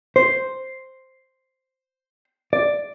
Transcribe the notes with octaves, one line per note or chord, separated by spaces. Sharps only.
C5
D5